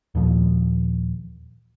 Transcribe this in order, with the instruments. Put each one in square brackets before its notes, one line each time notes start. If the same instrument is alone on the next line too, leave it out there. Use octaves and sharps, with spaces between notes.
[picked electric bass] D#2 A#2 F3